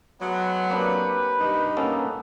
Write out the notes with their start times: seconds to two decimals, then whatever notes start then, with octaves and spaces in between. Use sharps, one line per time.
0.21 F#3 G#3 A3 B3
0.70 A#3 C4 D4 G4 B4
1.39 G2 D#4
1.77 A#3 B3 C#4 A4